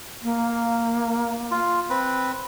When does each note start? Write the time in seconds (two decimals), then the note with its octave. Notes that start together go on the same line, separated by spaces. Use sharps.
0.23 A#3
1.51 F4
1.90 C4 B4